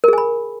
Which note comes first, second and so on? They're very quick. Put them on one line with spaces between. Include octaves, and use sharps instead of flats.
A#4 G#4 G#5 B5